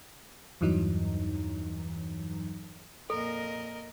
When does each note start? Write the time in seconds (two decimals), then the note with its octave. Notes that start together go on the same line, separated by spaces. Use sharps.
0.61 E2 G2 E3 F#3 D#4
3.10 F2 A#2 A4 A#4 D#5